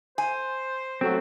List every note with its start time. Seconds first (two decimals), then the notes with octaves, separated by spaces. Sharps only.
0.18 C5 G#5
1.01 F#3 A3 C4 F#4